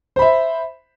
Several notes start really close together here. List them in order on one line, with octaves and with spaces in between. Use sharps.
C5 B5 E5